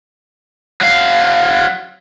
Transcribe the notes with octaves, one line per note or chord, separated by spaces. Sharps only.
F#3 F5